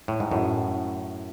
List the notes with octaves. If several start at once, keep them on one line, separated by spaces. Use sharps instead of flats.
A2
G#2
F#2 A2